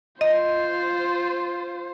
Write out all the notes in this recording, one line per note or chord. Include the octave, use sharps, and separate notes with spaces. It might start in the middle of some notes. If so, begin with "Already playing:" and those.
F4 C5 D#5